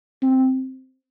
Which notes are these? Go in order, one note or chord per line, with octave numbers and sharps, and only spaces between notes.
C4